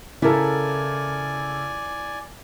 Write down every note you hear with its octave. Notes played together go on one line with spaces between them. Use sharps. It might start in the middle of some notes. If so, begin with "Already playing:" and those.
C#3 E4 A4 A#4 D5 G#5